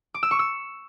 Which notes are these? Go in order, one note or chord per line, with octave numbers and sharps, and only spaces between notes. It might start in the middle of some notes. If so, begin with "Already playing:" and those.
D6
E6
C#6
E6